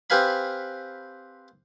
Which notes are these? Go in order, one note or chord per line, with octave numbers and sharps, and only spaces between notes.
C4 G4 B4 F5 G#5 B5